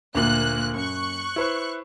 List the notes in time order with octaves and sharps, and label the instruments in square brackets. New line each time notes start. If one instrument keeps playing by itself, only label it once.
[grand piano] D2 A#2 F#7 [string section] A#3 F#6
[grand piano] F#2 [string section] C#6 F#6
[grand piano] E4 B4 C5